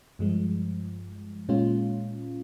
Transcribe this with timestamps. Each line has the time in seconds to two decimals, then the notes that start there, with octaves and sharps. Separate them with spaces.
0.19 G2 F3 G#3
1.49 A#2 G#3 C#4 F4